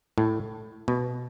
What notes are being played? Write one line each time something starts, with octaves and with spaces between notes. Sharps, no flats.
A2
B2